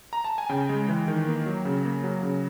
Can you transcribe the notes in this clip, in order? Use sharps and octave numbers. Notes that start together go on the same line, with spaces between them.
A#5
A5
G#5
C#3 G5
G#3
E3
D#3
A#3
F#3
C#3
A#3
F#3
C#3